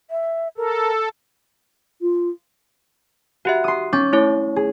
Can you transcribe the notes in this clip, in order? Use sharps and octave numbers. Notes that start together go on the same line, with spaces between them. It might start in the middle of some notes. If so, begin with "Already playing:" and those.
E5
A4 A#4
F4
F#4 G4 E5 F#5
C6 D#6
C#4 D6 G6 A6
A3 E4 C#5
G#4